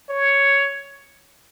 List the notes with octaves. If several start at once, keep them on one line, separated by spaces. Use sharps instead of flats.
C#5